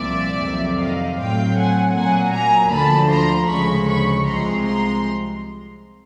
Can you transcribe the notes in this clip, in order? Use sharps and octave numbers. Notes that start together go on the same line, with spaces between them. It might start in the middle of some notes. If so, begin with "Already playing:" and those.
Already playing: C2 A#2 F3 D5 E5
F2 C3 D#3 F#3
D#5 F5
A2 F#3 A3 C4 F5 G5
F#5 G#5
A#2 F#3 A#3 F#5 G#5
G#5 A#5
D2 D3 F3 A5 B5
A#5 C6
D2 C#3 F3 G#3 B5 C#6
B5 C#6
C2 C3 F3 G#3 C4 A#5 C6
A#5 C6